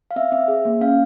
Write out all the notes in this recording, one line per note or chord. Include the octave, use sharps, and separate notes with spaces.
F5
C4 E5
C4 E5
G#4
A#3
C#4 F5